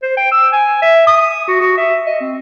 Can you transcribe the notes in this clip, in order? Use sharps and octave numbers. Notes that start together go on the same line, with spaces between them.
C5
G5
E6
G#5
E5
D#6
F#4
F#4
E5
D#5
C4